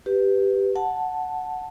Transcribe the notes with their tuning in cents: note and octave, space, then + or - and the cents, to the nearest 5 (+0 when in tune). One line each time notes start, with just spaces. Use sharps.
G4 +0 B4 +0
F#5 +0 A5 +0